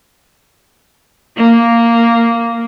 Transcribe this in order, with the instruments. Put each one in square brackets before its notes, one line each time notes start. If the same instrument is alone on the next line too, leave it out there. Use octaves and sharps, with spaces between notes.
[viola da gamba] A#3